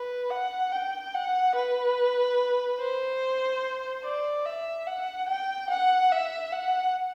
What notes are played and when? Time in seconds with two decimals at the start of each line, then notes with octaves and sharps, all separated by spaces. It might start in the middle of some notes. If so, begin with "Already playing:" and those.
Already playing: B4
0.30 F#5
0.72 G5
1.14 F#5
1.55 B4
2.80 C5
4.04 D5
4.45 E5
4.87 F#5
5.28 G5
5.70 F#5
6.11 E5
6.52 F#5